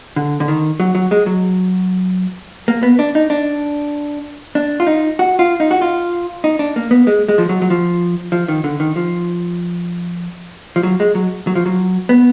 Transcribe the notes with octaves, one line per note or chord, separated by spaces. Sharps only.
D3
D3
D#3
F#3
F#3
G#3
F#3
A#3
B3
D4
D#4
D4
D4
F4
D#4
F#4
F4
D#4
F#4
F4
D#4
D4
A#3
B3
G#3
G#3
F3
F#3
F#3
F3
F3
D#3
D3
D#3
F3
F3
F#3
G#3
F#3
F#3
F3
F#3
B3